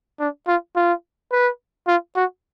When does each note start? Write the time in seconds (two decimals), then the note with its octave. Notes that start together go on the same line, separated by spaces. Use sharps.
0.20 D4
0.47 F4
0.76 F4
1.32 B4
1.87 F4
2.16 F#4